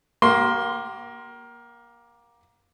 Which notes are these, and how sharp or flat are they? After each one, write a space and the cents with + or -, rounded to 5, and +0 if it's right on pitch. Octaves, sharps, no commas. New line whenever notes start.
A#3 +20 G4 -40 C6 +0